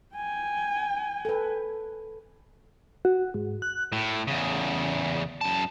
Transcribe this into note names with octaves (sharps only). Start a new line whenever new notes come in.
G5 G#5
A4 B4
F#4
G#2
F#6
A2
E2 C#3
F#2 A5